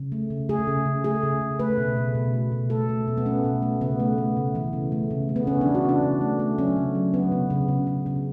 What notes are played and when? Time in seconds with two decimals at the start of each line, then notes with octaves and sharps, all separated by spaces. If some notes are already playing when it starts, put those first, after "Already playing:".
Already playing: C#3
0.12 A3
0.30 C#3
0.49 A3 G#4
0.67 C#3
0.86 C#3
1.04 A3 G#4
1.23 C#3
1.41 C#3
1.59 A3 B4
1.78 B2
1.97 B2
2.15 B2
2.34 A3
2.52 B2
2.70 A3 A4
2.89 A3
3.08 B2
3.17 B3
3.26 A3 C#4
3.44 B2
3.62 A3
3.81 C#3 B3
4.00 A3
4.18 A3
4.37 C#3
4.55 E3
4.73 C#3
4.92 A3
5.11 C#3
5.29 A3
5.36 B3
5.47 C#3 C#4
5.61 D4
5.66 E3
5.75 F#4
5.85 C#3 D4
6.03 C#3
6.21 A3
6.39 A3
6.58 F#3 C#4
6.77 C#3
6.95 F#3
7.14 F#3 B3
7.32 C#3
7.50 C#3
7.68 C#3
7.87 C#3
8.06 C#3